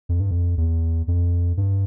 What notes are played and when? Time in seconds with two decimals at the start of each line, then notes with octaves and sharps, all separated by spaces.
0.09 F2
0.20 G2
0.31 F2
0.58 E2
1.08 F2
1.57 G2